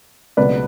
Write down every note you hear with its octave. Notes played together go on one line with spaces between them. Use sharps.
C#2 B2 F#3 A3 B4 D5